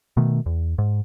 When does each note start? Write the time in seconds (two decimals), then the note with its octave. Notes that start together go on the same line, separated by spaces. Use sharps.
0.17 B2 D#3 A3
0.46 E2
0.78 G#2